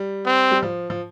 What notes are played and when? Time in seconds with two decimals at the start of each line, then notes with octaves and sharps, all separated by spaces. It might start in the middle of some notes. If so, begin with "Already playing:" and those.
Already playing: G3
0.26 C4
0.51 G3
0.63 F3
0.90 F3